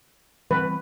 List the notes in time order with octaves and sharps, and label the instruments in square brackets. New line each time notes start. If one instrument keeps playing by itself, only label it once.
[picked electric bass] E3 G3 C4 [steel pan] B4